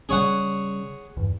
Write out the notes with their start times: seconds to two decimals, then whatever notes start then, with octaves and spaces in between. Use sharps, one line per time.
0.09 C#3 G3 C#4 G#4 C#5 F#5
1.17 E2 G2